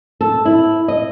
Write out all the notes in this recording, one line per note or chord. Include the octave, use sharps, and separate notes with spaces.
A4
E4
D#5